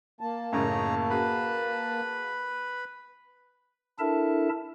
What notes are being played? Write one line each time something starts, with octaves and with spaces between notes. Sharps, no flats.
A#3 A5
F#2 A2 C#3 D#4 C#5 A#5
F#4 G#4 B4 B5
D4 E4 A4 A#4 E5 A5